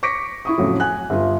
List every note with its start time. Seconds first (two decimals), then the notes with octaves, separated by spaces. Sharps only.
0.03 C#6 D6 A#6 B6 C#7 D7
0.45 E4 C#6 D#6
0.58 F2 A2 C#3 F#3
0.80 G#5 F#6
1.10 G1 F4